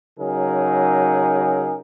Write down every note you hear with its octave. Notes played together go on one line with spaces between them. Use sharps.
C#3 F#3 D#4 G#4 A#4